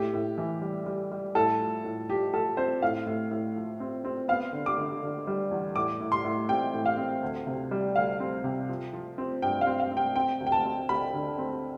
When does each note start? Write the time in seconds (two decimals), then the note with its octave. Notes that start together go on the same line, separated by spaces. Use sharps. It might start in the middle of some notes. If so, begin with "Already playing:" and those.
Already playing: A2 G4
0.14 A2
0.38 E3
0.62 G3
0.86 G3
1.11 G3
1.35 A2 A4
1.60 F3
1.84 A2
2.09 F3 G4
2.33 F3 A4
2.57 C4 C5
2.82 A2 F5
3.06 A2
3.31 A2
3.56 F3
3.80 C4
4.05 C4
4.28 B3 F5
4.53 D3
4.66 D6
4.78 D3
5.02 D3
5.27 G3
5.51 E2
5.75 A2 D6
6.01 A2
6.12 C6
6.25 A2
6.49 C4 G5
6.74 A2
6.86 F5
6.97 C4
7.23 D2
7.47 C3
7.71 G3
7.96 D2 F5
8.20 C4
8.44 C3
8.69 F3
8.93 F3
9.18 C4
9.42 G2 G5
9.61 F5
9.67 C4
9.80 F5
9.91 C4
9.97 G5
10.16 C4 G5
10.40 D2
10.47 G5
10.52 A5
10.65 C4
10.89 D2 B5
11.14 D3
11.38 C4